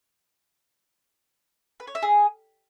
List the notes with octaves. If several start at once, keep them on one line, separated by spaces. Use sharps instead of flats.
B4
C#5
E5
G#4